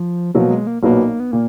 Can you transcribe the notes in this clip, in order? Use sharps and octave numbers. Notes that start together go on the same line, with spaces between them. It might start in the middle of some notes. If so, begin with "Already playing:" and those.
Already playing: F3
B2 F3 F#3 A#3
G#3
A#3
B1 A#2 F#3 A#3 B3
B3
A#2 A#3